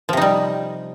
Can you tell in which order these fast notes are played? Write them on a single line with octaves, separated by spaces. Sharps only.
F3 C3 D#4 G3